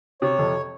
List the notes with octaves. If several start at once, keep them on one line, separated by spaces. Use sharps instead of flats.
C3 C#5
F2